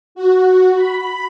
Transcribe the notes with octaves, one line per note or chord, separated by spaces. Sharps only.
F#4
B5